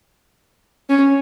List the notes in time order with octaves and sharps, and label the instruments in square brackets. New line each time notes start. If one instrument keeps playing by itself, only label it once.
[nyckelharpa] C#4